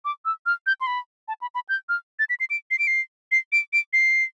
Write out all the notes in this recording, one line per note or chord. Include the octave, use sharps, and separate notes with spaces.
D6
E6
F6
G6
C6
B5
A5
B5
B5
G6
F6
A6
B6
C7
D7
C7
D7
C7
C7
D7
D7
C7